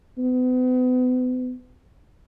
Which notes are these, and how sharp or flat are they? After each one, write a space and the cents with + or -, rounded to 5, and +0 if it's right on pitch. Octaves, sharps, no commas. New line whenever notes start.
B3 +40